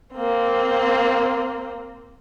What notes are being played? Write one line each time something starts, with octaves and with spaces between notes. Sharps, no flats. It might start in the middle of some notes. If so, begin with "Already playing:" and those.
A#3 C4